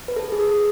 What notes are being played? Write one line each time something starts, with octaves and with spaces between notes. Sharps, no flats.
B4
A4
G#4
A4